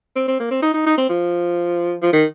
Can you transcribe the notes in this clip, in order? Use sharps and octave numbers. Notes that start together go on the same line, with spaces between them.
C4
C4
A#3
C4
D#4
D#4
D#4
C4
F3
F3
D#3